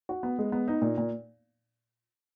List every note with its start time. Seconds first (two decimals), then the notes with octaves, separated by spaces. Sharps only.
0.09 F#4
0.23 B3
0.39 G#3
0.52 B3
0.68 D#4
0.82 A#2
0.98 A#2